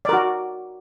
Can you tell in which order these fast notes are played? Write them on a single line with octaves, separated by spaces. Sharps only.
D5 A#4 F#4